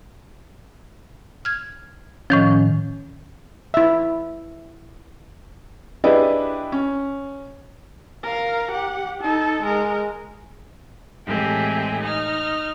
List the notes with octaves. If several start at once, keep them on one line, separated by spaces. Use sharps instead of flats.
F6 G#6
A2 D#3 F3 C#4
E4 E5
D4 E4 G4 G#4 B4 D#5
C#4
A#4 F5
G4 F#5
D#4 A4
G#3 A#4
A2 E3 G#3 C4 G4 G#4
D#4 F6